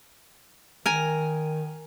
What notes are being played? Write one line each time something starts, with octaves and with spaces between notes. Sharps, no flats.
D#3 A#4 G#5